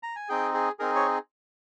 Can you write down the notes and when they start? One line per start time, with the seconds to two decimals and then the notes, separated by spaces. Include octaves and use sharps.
0.03 A#5
0.16 G#5
0.29 C4 D#4 G#4 G5
0.54 G#4
0.79 C4 D#4 G#4 A#4
0.95 C#5